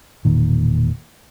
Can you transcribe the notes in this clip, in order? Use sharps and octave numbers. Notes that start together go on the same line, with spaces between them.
E1 A#2 D#3